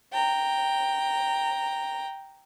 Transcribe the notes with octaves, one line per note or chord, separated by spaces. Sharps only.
G5 A#5